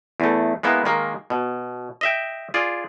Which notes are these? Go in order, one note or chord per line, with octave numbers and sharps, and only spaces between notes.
E2 A3
G#3 A#3 B3 E4
D#3 G#3 A#3
B2
D#5 E5 G5
F4 G#4 D5